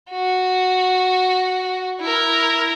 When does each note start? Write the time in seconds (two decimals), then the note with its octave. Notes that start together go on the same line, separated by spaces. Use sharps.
0.11 F#4
2.01 E4 A#4